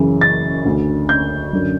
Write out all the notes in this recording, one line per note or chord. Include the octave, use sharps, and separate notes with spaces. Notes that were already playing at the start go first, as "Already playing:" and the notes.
Already playing: F#2 C#3 E3
A6
D2 D3
G6
F#2 D3